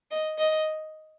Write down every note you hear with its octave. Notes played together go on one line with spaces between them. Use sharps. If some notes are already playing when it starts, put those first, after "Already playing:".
D#5
D#5